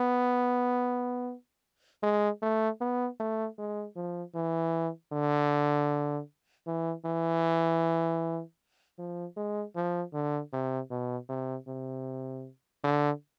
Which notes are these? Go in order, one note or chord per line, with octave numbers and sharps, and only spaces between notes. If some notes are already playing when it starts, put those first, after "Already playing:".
Already playing: B3
G#3
A3
B3
A3
G#3
F3
E3
D3
E3
E3
F3
G#3
F3
D3
C3
B2
C3
C3
D3